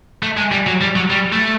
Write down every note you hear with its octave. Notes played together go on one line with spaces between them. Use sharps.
A3
G#3
G3
F#3
G3
F#3
G3
A3